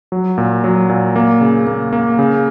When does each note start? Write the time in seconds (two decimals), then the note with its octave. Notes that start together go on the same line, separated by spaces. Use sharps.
0.12 F#3
0.38 A#2
0.64 F#3
0.89 A#2
1.16 A#3
1.41 C#3
1.67 A#3
1.93 A#3
2.19 C#3